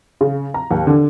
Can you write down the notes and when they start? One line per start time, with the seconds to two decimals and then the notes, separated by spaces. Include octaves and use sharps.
0.21 C#3
0.54 A#5
0.71 D#2
0.87 D3